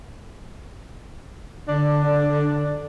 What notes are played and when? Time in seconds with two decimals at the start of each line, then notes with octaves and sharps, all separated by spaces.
1.68 D3 D4